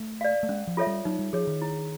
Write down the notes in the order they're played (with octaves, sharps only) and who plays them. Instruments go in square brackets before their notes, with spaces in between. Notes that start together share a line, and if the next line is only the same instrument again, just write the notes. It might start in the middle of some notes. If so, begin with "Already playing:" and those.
Already playing: [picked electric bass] A3
[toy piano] D5 F5
[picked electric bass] A3
[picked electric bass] G#3 [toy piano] C#4
[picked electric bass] F3
[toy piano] F4 A4 C#5 E5
[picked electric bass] G3
[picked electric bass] F#3 [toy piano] D#4
[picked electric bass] G3
[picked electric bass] F3 [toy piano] G#4 C#5
[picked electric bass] D#3
[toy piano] E4